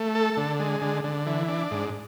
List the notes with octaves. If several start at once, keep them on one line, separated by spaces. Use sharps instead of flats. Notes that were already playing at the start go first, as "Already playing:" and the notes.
Already playing: A3
A4
D3
G#3
D3
D3
E3
D4
G#2